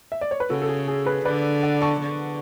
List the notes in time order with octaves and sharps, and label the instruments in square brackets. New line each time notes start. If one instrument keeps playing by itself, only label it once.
[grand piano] E5
D5
C#5
B4
[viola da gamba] C#3 [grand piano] F#4 A4
[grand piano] A4
G#4
G#4
G#4 B4
[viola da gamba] D3 [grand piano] B4 D5
[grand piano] D5 F#5
A5 C#6
[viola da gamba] D3